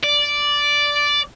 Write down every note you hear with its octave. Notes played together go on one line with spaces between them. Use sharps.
D5